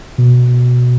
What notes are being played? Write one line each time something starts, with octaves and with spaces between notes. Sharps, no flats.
B2